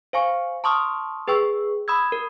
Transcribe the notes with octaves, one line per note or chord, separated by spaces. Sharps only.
C5 F5 G#5 C#6
A5 C6 C#6 D#6 F6
G#4 B4 G5 C#6 E6
B5 D#6 E6 G#6
A#4